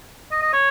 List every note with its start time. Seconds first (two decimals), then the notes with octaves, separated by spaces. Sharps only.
0.32 D#5
0.42 D#5
0.53 C#5